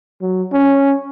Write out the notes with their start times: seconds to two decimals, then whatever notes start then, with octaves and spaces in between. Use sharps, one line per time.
0.21 F#3
0.52 C#4